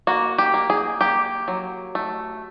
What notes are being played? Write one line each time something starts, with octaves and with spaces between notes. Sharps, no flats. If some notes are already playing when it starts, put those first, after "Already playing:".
A#3 F#4
G4
A#3
G#4
A#3 G4
F#3
A3